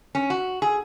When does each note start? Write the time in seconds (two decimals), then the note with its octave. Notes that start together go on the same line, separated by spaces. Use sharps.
0.15 C#4
0.30 F#4
0.62 G#4